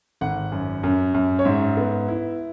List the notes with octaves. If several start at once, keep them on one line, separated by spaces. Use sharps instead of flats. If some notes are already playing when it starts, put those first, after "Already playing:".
G#1 F#5
F#2
F#2
F#2
C#5
G#2 E5
B3
E4